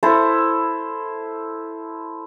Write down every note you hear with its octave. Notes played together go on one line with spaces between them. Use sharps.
E4 A4 C5